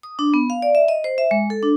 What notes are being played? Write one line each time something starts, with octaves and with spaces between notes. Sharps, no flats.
D#6
D4
B3
F5
D5
E5
D#5
C5
E5
G#3
A4
D4